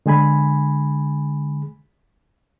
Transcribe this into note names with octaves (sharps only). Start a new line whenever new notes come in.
D3 G#3 G#4 G#5 B5